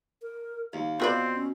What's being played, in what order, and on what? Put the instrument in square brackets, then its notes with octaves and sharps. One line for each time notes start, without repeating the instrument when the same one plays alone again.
[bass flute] A#4
[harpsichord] D#2 [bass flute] F5
[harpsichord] B2 [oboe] C4 [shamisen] F4 B4 D5
[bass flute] C#4